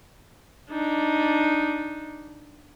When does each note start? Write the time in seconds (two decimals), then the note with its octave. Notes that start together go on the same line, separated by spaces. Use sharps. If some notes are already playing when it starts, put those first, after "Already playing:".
0.71 D4 D#4